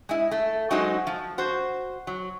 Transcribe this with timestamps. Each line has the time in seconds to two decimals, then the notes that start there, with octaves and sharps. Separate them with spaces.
0.09 G#3 E4
0.31 A3
0.71 F#3 G#3 D#4 F#4 C5 C#5
1.07 F3
1.38 F#4 C5
2.07 F#3